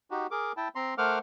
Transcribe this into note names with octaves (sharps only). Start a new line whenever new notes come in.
D#4 F#4 G4
G#4 A#4 D6
E4 G5 A5
C4 A#5 C6
A3 A#4 C5 F#5 D6 F6